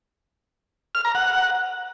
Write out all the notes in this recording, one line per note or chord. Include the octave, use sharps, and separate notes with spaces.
F6
A#5
F#5